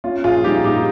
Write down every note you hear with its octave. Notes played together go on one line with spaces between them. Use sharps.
C#4 F4
A#1 F4 G#4
G3 D#4 G4
A#2 D#4 G4